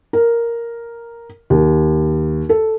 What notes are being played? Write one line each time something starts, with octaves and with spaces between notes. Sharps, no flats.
A#4
D#2
A4